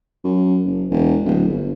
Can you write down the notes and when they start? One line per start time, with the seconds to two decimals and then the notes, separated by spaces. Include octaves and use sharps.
0.24 F#2
0.65 F#1
0.90 E1
1.26 D1
1.48 G1